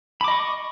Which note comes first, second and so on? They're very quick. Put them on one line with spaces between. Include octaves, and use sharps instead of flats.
B5 D6 D#5 C#6